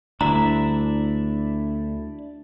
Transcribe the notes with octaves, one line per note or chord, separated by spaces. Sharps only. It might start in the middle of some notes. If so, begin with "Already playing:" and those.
D2 G3 D4 E4 E5 A#5